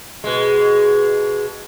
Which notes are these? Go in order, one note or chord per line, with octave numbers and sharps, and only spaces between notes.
B2 G#3